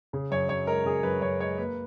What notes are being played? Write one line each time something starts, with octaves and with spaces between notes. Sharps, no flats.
C#3
F#2 C#5
F#2 C#5
G#3 A#4
C#3 G#4
F#2 B4
F#2 C#5
G#3 C#5
A#3 B4